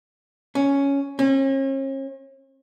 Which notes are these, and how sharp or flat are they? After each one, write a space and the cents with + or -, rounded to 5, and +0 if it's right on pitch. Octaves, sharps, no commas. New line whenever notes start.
C#4 +5
C#4 -45